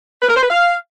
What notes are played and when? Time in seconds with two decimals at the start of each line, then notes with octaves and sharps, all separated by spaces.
0.22 B4
0.29 A#4
0.36 C5
0.43 B4
0.50 F5